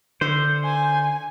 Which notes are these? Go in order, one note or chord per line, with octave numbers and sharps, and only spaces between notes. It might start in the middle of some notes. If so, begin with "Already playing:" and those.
D3 C5
G#5